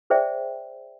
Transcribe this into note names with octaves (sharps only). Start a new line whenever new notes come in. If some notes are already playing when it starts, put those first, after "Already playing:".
G#4 C5 D5 E5 G5